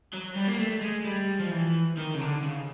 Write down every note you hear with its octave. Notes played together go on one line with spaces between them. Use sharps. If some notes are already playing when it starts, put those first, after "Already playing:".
F#3
G3
A#3
A3
G#3
G3
F3
E3
D#3
C#3
D3
C#3